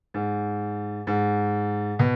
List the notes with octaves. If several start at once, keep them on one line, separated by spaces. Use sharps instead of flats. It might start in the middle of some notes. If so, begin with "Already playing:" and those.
G#2
G#2
B2